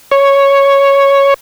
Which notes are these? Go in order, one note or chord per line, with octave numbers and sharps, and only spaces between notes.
C#5